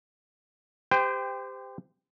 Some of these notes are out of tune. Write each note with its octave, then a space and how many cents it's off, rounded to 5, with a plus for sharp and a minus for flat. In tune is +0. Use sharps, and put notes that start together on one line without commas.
G4 +20 C5 -30 G5 +10